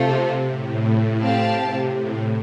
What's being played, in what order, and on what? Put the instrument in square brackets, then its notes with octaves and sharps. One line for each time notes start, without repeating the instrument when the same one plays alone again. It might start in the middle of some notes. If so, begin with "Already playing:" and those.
Already playing: [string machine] C3 [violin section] A3 F4 A4 C5
[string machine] A2
[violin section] C4 G4 F5 A5
[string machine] C3
A2